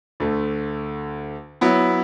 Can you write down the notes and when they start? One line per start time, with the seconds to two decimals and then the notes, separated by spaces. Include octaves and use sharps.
0.20 D2 D3 A3
1.61 F#3 B3 E4